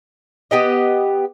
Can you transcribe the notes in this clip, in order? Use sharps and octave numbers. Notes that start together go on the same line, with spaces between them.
B3 G4 D#5